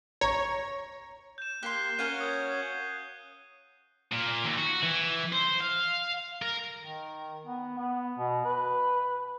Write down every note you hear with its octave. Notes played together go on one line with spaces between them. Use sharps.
C#5 A#5
G6 E7
A#3 G4 C6 F#6 C7
C#4 F#4 A#4 C#5 F5 F#5 D#7 G7
D#6 G6 G#6
A#2
D#2
F#4
E3
C5
F5
A#4
D#3
B3
B3
B2
B4